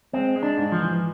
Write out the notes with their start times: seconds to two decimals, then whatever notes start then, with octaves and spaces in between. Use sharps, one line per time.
0.13 G#3 C4
0.36 G#3
0.43 D4
0.57 G#2
0.72 F3
0.79 E3